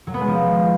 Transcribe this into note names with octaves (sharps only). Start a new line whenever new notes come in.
F#3
B3
G#3
F3